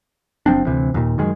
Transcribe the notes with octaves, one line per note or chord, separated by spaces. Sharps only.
F#1 F3 C4 D4
D2 C3 E3
D#2 A#2
F#2 D#3 G#3